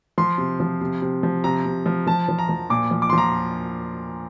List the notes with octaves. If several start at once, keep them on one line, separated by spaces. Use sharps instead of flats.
F3 C6
C3
F3
C3
C3
F3
C3 A#5
C3
F3
F3 A5
F3
A#5
F3
A#2 D6
F3
D6
C6
F3
A#5